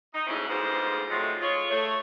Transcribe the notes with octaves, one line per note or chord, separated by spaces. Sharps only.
D#4
D2 G#2 C4 C#4 E4
D2 G#2 G#3 B3 F4 C5
C3 F3 F#3 G#3 A3
F4 G#4 C#5
A3 C#5